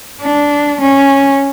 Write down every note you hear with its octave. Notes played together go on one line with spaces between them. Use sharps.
D4
C#4